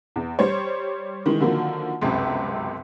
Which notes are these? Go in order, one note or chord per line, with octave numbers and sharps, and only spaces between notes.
E2
G3 C5 C#5
D#3 E3 G#3
D3 D#3 F3 F#3 A#3
G1 C#2 F#2 C3